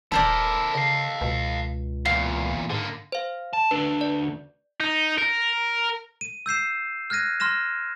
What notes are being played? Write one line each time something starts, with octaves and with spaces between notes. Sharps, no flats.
D#1 E4 A4 A#4 C5 D5
C#3 D#5 F5
C#2 B2
E2 A#2 F5
G#2 D3 A#3
C5 F5
A5
D2 D4 B4
D5
D#4
A#4
D#7
E6 G6 C7 E7
F6 F#6 G#6 A#6 D#7
C6 F6 A#6 E7